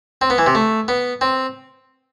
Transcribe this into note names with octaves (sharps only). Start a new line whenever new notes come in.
C4
B3
E3
C3
A3
B3
C4